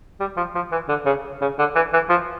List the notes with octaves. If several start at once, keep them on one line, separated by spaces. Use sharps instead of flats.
G3
F3
F3
E3
D3
C#3
C#3
D3
E3
E3
F3